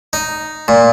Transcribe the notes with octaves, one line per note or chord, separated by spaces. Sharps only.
D#4
A#2